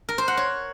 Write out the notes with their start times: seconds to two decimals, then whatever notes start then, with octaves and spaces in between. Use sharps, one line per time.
0.09 A#4
0.18 C5
0.28 F#5
0.37 C#5